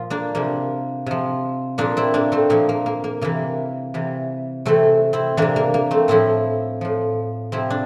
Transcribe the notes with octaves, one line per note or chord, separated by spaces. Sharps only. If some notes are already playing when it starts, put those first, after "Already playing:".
Already playing: A#2 F3 F4
A#3 D4
C3 F3 A#3
C3 F3
A#2 F3 A#3 D4
C4 E4
A#3 D4
A3 C4
A#2 F3 A#3
A#3
A#3
A#3
C3 E3 A#3
C3 E3
C3 E3 A3 C4
C4 E4
C3 E3 A#3 D4
A#3
A#3
A3 C4
A2 F3 C4 E4
A2 F3
C3 F3 C4 E4
D4